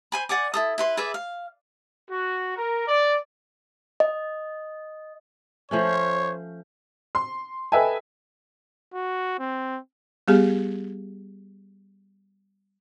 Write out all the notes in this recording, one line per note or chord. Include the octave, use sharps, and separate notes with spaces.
C5 G#5 B5
D5 F#5 G#5 D6
E4 A4 D#6
E4 B4 C6
G#4 B4 D5 E5
F5
F#4
A#4
D5
D#5
F3 A3 C#4 C5 C#5
C6
A4 B4 D#5 E5 G5 G#5
F#4
C4
G3 B3 G4 G#4